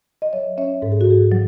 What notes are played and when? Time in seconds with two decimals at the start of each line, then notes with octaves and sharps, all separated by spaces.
0.22 D#5
0.33 F#3 C#5 E5
0.58 C#4 C#5 E5
0.82 G#2 A4
0.92 G#4
1.01 F#4
1.07 G#2 G#4
1.32 F#3